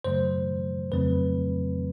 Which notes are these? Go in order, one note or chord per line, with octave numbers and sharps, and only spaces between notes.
F#2 C#3 F#3 A3 C5
F2 C#3 F#3 A3 C4 B4